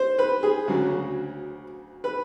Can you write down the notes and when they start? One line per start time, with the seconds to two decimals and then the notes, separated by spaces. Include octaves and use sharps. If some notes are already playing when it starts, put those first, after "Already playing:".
Already playing: C5
0.19 B4
0.43 G#4
0.68 D2 C#3 F#3
2.04 B4